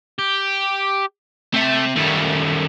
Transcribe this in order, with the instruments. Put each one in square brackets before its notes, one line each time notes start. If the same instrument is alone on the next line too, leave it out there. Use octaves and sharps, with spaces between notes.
[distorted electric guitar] G4
[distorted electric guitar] A3 [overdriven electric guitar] C4 E5
[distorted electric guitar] F#2 A3 [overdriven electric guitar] D#3 G3